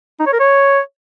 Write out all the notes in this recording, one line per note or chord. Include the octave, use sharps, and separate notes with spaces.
D#4
C#5
A#4
C#5